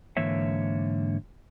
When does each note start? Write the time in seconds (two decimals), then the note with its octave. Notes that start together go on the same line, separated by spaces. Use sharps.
0.17 G#2 D3 E3 A#3 C#5 E5